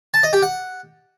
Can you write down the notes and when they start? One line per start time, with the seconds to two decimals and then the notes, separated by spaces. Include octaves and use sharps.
0.14 A5
0.23 D#5
0.33 G4
0.42 F#5